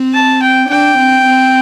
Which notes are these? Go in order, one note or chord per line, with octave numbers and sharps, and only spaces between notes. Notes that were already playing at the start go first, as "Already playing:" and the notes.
Already playing: C4
A5
G5
D4 G5
C4
C4